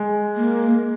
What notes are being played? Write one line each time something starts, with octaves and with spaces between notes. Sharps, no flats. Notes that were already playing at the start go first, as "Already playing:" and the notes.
Already playing: G#3
A#3